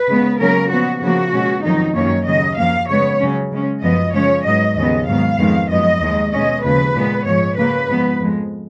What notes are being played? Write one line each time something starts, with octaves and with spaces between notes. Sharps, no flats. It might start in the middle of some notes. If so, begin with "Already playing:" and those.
Already playing: B4
C#3 G#3 B3
C#3 F#3 A#3 C#4 A#4
A#2 F3 B3 F#4
C#3 F3 A#3 F#4
B2 G#3 C#4
F2 D#3 F#3 D#4
F#2 D#3 F#3 A#3 C#4 C#5
D#2 C#3 F#3 D#5
F#2 F3 A#3 F5
C#3 G#3 B3 C#5
C#3 F#3 C#4
C#3 G#3 C#4
F#2 F3 B3 D#5
C#3 F3 G#3 C#4 C#5
G#2 F#3 B3 D#5
D#2 C#3 F3 B3 D#5
G#2 D#3 F#3 B3 F5
F2 D#3 G#3 B3
F#2 F3 G#3 B3 D#5
D#2 D#3 G#3
B2 G#3 C#4 D#5
D#2 C#3 F3 G#3 B4
A#2 G#3 B3
G#2 F3 G#3 C#5
C#3 F#3 A#3 B4
G#2 F3 B3
F2 F3 G#3